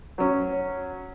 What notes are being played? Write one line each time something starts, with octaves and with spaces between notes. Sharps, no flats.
F#3 C#4